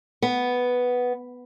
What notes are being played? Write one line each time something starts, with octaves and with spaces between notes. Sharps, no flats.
B3